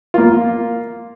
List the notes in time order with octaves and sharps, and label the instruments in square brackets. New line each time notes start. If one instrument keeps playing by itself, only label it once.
[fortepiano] A#3 F4